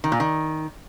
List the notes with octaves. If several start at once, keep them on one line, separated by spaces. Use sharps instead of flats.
D#3
A#2
D#3